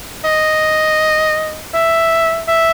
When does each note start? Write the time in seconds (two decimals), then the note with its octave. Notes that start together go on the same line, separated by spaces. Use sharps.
0.25 D#5
1.74 E5
2.48 E5